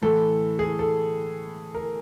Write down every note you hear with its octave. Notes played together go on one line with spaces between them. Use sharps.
A2 E3 A3 A4
G#4
A4
A#4